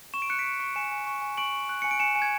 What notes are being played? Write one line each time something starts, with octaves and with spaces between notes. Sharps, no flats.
C#6 E7
D7
F#6 C#7
B6 D7
C#6
C#6
G#5 C#7 E7
G#5
C#6
G#5
C#6 D7 F#7
C#6
F#6
G#5 C#7
D7
G#5 C#7 E7
G#5
G#6